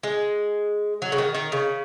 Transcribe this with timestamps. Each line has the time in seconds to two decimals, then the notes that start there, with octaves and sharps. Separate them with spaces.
0.03 G#3
1.02 F#3
1.12 C#3
1.18 D#3
1.35 D#3
1.52 C#3